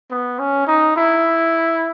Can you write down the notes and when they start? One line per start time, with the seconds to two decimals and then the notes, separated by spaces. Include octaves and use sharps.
0.11 B3
0.39 C#4
0.67 D#4
0.96 E4